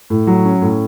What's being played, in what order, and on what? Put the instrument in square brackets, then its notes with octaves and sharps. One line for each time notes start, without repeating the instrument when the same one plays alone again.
[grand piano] A2
F#3
C#4
A2